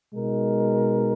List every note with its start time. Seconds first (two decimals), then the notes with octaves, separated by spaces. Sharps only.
0.14 B2 G#3 D#4 A#4